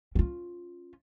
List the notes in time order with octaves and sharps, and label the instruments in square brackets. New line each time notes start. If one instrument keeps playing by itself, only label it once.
[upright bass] C#4 F4